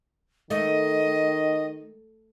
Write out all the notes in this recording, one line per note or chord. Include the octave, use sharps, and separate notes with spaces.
D#3 A3 D#5